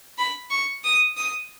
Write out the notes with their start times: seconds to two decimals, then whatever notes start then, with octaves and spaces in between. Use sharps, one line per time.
0.18 B5
0.50 C#6
0.84 D#6
1.17 D#6